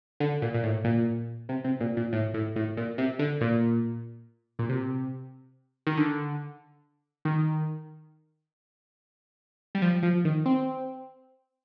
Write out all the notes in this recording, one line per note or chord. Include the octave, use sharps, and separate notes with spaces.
D3
A#2
A#2
A2
A#2
C3
C3
A#2
A#2
A2
A2
A2
A#2
C3
D3
A#2
A#2
C3
D#3
D3
D#3
G3
F3
F3
D#3
C4